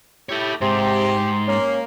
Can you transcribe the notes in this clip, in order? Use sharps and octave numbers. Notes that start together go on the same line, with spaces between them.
E4 G4 A4 C#5
G#2 C3 G4 C6
A#3 C#4